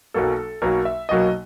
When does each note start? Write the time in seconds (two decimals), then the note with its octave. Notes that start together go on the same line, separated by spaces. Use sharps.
0.14 B1 B2 F#3 A#3 A4
0.62 B1 B2 F#3 A#3 A#4
0.85 E5
1.09 B1 B2 F#3 A#3 D#5